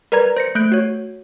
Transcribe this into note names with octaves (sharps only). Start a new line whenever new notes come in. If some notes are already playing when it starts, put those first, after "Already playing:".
A#4 B4 D5 A#5 G#6
C5 A#6 C#7
A3 F#6 G6 D7
F#4 C#5